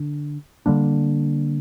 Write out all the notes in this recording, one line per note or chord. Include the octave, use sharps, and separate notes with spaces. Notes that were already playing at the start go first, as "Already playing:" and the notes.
Already playing: D3 D4
D3 G3 A#3 D4